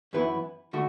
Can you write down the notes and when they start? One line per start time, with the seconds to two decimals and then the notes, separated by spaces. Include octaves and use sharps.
0.13 F#2 E3 B3 E4 B4
0.73 D3 A3 F#4